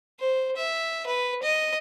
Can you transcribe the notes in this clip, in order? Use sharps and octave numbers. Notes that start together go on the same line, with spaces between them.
C5
E5
B4
D#5